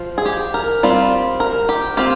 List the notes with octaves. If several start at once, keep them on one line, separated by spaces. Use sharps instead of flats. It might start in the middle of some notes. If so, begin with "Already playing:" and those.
Already playing: F3 F4
G#4
G4
A#4
G3 C4 F4
A#4
G4
C4 F4 G4